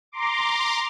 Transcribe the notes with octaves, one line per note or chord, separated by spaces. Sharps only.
A#5 C6 D6